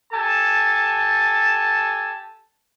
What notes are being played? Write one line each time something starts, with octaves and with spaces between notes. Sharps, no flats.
G4 A4 G#5 A5